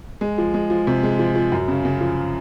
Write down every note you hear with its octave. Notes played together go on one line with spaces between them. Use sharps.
G#3
F3
G#3
F3
C3
G#3
F3
F3
F#2
C#3
C#3
F3